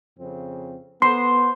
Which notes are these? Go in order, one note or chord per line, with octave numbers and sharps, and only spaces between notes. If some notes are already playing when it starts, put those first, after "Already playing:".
F2 C#3 C4
B3 C5 C6